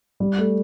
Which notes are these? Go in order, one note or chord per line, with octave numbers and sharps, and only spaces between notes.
G3
A3